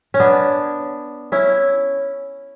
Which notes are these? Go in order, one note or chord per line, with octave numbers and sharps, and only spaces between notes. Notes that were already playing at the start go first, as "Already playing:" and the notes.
C#4
B3 D4
C#4 E4